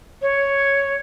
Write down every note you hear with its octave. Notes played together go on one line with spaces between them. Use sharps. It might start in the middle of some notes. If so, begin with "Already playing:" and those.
C#5